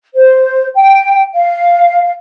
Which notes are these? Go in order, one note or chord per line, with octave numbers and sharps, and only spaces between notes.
C5
G5
F5